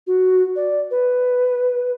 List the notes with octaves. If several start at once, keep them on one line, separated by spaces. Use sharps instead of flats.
F#4
D5
B4